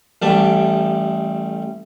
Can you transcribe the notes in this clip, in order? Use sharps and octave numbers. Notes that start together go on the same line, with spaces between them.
A1 G3 A3 A5 D6